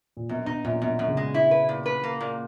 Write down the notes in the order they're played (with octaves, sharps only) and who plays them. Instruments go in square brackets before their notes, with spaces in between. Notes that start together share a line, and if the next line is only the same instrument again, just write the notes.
[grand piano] A#2
[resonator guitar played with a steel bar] F#2 [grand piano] B2
[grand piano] B2 [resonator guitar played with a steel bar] D#4
[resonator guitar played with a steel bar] F#2 [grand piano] A#2
[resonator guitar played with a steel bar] F#2 [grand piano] B2
[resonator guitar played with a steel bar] F#2
[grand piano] C#3
[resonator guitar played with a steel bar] G#3
E4
B4
A#2
B4
A#3
A#2